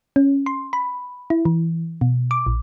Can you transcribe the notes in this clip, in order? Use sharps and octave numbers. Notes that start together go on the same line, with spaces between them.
C#4
C6
B5
E4
E3
B2
D6
A#1